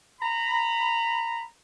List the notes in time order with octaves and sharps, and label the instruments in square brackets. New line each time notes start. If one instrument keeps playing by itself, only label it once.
[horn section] A#5 B5